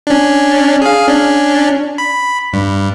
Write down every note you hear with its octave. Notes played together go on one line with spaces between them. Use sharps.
C#4 D4
G#4 F5
C#4 D4
B5
G2